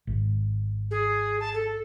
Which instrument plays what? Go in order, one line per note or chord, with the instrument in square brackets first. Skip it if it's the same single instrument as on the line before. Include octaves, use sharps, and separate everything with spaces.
[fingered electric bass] G#1
[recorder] G#4
A5
A4